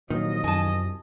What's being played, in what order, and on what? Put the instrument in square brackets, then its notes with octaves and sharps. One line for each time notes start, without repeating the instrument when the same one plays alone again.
[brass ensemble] C2 F3 D#5 [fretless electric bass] A#2 F#3 [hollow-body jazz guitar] D#3
[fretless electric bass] F#2 [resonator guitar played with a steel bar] G#5 A5